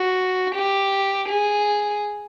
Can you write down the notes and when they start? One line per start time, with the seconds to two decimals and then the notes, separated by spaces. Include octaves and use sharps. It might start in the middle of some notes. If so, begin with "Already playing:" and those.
Already playing: F#4
0.55 G4
1.29 G#4